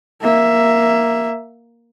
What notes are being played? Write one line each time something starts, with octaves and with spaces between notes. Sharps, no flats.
A#3 E5